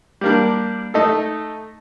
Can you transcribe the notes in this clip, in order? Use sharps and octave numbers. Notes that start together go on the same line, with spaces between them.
G3 A#3 D4
A3 D#4 A4 D#5